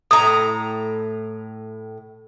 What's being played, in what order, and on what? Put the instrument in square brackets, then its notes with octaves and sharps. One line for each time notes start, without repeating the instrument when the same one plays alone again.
[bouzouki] A2 A#5 [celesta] D#6